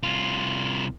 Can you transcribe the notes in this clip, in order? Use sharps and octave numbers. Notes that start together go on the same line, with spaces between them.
C2 F4